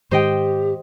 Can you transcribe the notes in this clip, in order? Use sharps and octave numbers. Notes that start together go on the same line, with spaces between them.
G#2 D#3 G4 C5 D#5 G5